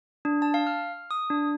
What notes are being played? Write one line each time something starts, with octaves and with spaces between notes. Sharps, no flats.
D4
A5
F5
F6
D#6
D4